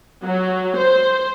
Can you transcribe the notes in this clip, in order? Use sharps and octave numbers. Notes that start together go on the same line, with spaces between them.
F#3
C5